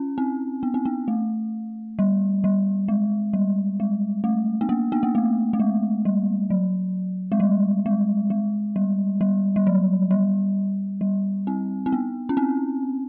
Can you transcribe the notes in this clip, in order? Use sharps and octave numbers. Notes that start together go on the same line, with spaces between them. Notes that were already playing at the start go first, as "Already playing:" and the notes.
Already playing: C#4
C4
B3
C4
B3
A3
G3
G3
G#3
G3
G#3
A3
B3
A#3
B3
A#3
A3
A3
G#3
G3
F#3
G#3
G3
G#3
G#3
G3
G3
G3
F#3
G3
G3
C4
C4
B3
C#4
C4